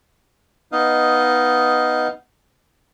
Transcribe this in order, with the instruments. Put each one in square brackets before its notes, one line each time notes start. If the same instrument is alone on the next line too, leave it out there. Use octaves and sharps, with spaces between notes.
[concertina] B3 D#4 D#5 F5